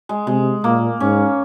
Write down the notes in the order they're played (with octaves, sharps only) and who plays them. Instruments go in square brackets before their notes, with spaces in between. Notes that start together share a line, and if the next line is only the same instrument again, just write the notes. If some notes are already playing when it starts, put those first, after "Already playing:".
[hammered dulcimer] G#3
[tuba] C3 [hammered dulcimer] G#3
[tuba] A#2 [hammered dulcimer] A#3
[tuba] G#2 [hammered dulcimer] C#4